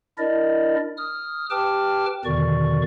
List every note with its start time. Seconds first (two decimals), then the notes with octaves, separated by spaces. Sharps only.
0.18 D4 E4 A#4 D5 D#5
0.97 D#6 F6
1.50 G4 B4 G5 A5 D6 F6
2.25 E2 B2 D3 D#3 D5 C#6